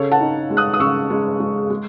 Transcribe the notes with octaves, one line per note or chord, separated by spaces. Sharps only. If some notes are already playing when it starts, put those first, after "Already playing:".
Already playing: C#3 A4 C#5
F#5 A5
D#4
G#3
D#6 F#6
D#6
C#3 C#6 E6
G#3
G#3
G#3